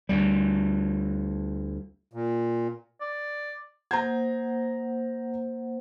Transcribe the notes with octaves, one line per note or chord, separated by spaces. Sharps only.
D2 G3
A#2
D5
A#3 C5 F#5 A#5 G6 G#6